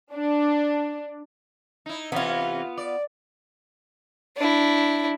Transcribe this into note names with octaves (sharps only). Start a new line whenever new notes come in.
D4
D#4 E4
C3 E3 B3 C#4 F4
D5
D4 E4